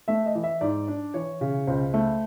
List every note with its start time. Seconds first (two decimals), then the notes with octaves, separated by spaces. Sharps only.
0.08 A3 E5
0.26 D#5
0.35 E3
0.44 E5
0.61 G#2 D5
0.88 D4
1.14 E3 C#5
1.41 C#3
1.67 C#2 C5
1.94 A3